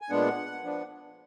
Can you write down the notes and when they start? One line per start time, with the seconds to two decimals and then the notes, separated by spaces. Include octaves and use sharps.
0.02 G#5
0.10 A#2 G#3 B3 D4 F#5
0.63 F3 B3 D4